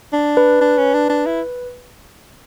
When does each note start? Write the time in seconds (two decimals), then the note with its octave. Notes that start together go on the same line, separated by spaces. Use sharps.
0.13 D4
0.37 B4
0.61 D4
0.78 C#4
0.94 D4
1.09 D4
1.26 E4